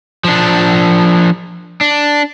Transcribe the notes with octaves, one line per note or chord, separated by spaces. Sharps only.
F3 D4
D4